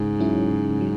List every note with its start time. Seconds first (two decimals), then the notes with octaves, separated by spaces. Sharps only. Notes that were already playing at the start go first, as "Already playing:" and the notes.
Already playing: G#2 C#3
0.19 F#3 C#4 E4
0.50 C#3
0.81 F#3